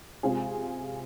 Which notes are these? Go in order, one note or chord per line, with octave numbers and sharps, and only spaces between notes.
C3 G#3 C4 F4 G#4